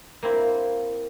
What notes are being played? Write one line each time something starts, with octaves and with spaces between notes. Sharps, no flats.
A#3 C4 E4